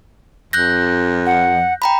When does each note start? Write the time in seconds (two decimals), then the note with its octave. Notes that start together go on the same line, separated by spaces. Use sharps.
0.53 F2 F#6 G6 A#6
1.26 F#5
1.82 G5 A#5 B5